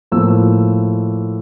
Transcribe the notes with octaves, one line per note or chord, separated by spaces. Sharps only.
A2 F3 A#3 E6